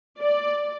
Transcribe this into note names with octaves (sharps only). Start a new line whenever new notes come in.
D5